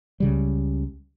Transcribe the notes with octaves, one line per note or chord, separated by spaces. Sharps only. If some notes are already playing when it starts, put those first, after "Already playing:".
C#2 C#3 G3